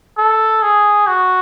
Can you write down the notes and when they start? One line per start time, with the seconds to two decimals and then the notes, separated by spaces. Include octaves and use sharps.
0.18 A4
0.62 G#4
1.07 F#4